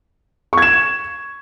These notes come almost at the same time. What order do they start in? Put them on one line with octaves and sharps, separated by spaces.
C#6 G#6 E7